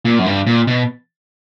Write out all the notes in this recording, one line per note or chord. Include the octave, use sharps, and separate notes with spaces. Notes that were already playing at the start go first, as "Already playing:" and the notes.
A#2
F#2
G2
A#2
B2